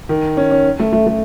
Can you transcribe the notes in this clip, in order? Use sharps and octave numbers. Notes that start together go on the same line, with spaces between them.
D#3
C#4
C#4
A3
A3
A3